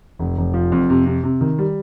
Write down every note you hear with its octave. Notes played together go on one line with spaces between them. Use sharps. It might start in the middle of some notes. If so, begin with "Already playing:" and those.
F1
F1
F3
F2
C3
C3
C3
D#3
G3